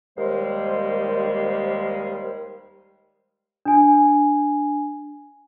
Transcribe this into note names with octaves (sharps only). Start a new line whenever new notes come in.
D#2 G3 G#3 C5
D4 G#5